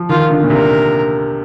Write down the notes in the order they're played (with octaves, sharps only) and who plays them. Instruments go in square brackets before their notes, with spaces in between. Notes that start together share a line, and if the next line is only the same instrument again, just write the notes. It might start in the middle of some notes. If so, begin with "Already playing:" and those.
Already playing: [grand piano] F3
[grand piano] D#3 [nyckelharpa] F4
[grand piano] D3
A#2
[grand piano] C3 [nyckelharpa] A#4